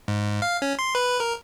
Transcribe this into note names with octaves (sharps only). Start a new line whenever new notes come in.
G#2
F5
C#4
C6
B4
A#4